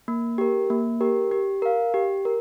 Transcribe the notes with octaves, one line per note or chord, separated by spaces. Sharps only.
A#3
G4 A#4
A#3
G4 A#4
G4
A#4 F5
G4
A#4